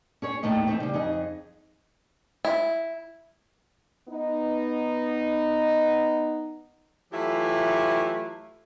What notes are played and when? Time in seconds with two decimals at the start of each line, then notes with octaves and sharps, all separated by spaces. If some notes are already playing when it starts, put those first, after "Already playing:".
0.22 C#4 G#4 C#5
0.43 D#2 A2 D#3 A3 D#5
0.67 E3 A3 C4 D#4
0.80 C#3 G3
0.94 F2 D#4 G#4 D#5
2.45 E4
4.08 B3 D#4
7.13 E3 F#3 A3 E4 F4 G4